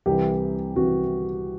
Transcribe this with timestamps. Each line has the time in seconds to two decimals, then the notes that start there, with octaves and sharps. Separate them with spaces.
0.06 C2 C3 E3 G4
0.76 C2 C3 E3 F#4